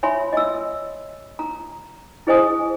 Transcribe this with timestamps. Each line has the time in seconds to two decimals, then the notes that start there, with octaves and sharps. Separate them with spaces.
0.03 C#5 E5 G#5 B5 C6
0.33 D#5 E6
1.39 A#5
2.27 E4 G#4 C5 D#5 G#5 D#6